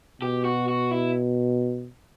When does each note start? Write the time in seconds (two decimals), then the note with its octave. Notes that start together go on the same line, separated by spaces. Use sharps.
0.22 B2 G4
0.45 F#4
0.68 F#4
0.91 E4